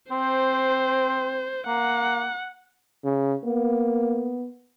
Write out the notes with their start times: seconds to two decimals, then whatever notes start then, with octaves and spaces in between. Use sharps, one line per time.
0.11 C4 C5
1.67 A#3 F#5
3.04 C#3
3.44 A#3 B3